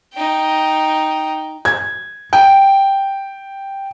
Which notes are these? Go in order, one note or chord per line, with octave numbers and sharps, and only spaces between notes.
D#4 G5
G#6
G5